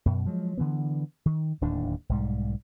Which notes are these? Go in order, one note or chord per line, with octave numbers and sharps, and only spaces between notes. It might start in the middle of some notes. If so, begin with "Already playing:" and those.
F#2 B2
F3 F#3 G#3
D3 E3 B3
D#3
D1 D#2 A2 D4
B1 G#2 G3